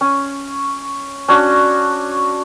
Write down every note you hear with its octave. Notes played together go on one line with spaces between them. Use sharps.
C#4
C#4 D4 F#4